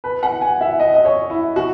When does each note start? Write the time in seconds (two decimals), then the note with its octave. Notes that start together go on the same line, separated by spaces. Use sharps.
0.04 B4
0.23 F#5
0.41 G#5
0.61 E5
0.80 D#5
0.94 D#5
1.05 C#5
1.30 E4
1.56 F#4